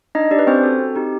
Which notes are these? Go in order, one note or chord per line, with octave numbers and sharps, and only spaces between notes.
D4 D#4 D#5
D4 G4 D5
B4
C4 C#4 C5
F#4 A4
C4
D#4 G4